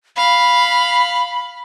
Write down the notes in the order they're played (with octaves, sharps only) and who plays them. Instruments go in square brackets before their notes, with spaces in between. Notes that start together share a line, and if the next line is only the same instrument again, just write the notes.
[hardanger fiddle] F5 [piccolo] B5